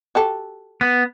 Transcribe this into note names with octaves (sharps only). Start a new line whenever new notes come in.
F#4 G4 A4
B3